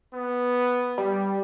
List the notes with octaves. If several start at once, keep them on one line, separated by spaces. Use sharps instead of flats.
B3
G3